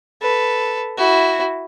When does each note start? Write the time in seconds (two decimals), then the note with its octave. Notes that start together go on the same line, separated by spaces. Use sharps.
0.21 A4 B4
0.97 E4 F#4